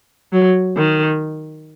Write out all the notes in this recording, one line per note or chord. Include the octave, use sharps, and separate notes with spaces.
F#3
D#3